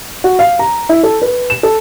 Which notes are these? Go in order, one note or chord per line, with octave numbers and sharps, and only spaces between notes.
F#4
F5
A#5
E4
A4
B4
E7
A4